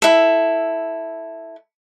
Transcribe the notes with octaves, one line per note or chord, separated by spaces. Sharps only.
E4 A4